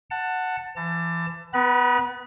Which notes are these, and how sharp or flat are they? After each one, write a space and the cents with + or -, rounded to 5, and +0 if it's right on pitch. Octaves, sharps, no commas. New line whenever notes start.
F#5 +0 A5 +15
E3 +35 A5 +25
B3 +20 B4 -15 B5 -40